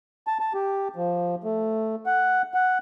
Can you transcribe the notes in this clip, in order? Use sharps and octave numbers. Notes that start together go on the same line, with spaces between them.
A5
A5
G4
F3
A3
F#5
F#5